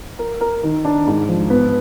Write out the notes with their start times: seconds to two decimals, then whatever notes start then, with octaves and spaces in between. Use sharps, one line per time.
0.19 A#4
0.41 A#4
0.63 D#3
0.85 D4
1.07 G#2
1.28 F3
1.50 B3